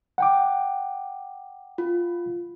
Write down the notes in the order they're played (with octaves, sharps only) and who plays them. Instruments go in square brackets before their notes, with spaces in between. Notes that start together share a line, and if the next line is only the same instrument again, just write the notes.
[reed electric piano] F#5 G5 D6
[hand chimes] F4